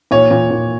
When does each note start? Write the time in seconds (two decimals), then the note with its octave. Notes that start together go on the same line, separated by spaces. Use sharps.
0.11 A#2 C#5
0.31 A#2
0.51 A#2